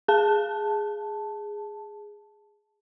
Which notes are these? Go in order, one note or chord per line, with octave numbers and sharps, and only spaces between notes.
G#4 A5